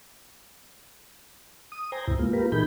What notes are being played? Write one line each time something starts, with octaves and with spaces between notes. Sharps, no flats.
D#6
C5 G5 G#5 A#5
D2 G#2 C3 E4
G#3 A#3 B3 F4
A#3 B3 F4 G4 A#4 B4
A#2 E3 D#4 G#4 B5 G6